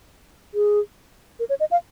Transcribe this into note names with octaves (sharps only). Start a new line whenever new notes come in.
G#4
A#4
C#5
D#5
F5